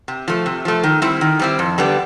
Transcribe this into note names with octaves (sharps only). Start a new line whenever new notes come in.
C3
F3 A3
C3
F3 A3
D#3
G3 C4 E4
D#3
G3 C4 E4
F2
D3 G3 B3